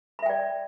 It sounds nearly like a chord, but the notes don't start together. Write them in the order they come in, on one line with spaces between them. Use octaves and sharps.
B5 E5 G5 D5